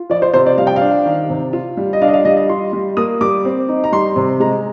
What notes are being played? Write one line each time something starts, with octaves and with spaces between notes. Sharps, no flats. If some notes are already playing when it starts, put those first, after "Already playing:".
Already playing: F4
F3 D5
C5
C3 C5
D5
G3 F5
G5
F5
D4
D#3
C3
F4
G3
D#5
D4 F5
D#5
F5
G3 D#5
D#5
F4 C6
G3
A#3 D#6
G3 D6
C4
D#4
A#5
G3 C6
C3
G#3 A#5